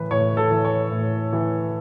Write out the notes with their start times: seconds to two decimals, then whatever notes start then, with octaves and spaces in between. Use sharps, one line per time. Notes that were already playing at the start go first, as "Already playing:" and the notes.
Already playing: A2 E3 B4
0.11 A2 C#5
0.37 A4
0.51 E3
0.65 C#5
0.91 A2
1.33 E3